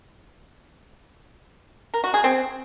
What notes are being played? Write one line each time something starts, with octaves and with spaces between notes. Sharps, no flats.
A#4
F#4
G#4
C4